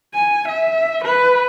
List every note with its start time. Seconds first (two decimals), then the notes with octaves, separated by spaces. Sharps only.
0.14 G#5
0.49 E5
1.05 B4